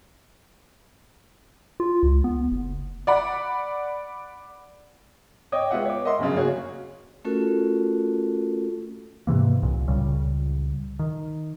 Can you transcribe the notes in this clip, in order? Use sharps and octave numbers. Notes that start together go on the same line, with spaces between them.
F4
C#2
B3
F#1
D5 F#5 B5
C#5 D#5 G5 D6 D#6
G#3 B3 F4 E5 F#5 G5
C#5 D6
A#4 D#5 E5 F#5 C6
G1 F#2 C#3
A#3 F#4 G#4 C#5
A3 C#4 F4 F#4 A4 A#4
G#2 C3 E3 A#3
C2 A#2
C#2 A#2 C#3 G3
D#3